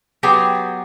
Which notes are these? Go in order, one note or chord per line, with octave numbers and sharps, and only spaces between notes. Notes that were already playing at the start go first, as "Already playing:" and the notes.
F#3 B3 G4 G#4 G5